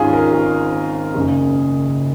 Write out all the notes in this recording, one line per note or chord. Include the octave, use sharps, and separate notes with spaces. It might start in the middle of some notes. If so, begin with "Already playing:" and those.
Already playing: G#1 G#2 D#3 C#4 F4 G#4
A#4
G#4
F#1 F#2 C#3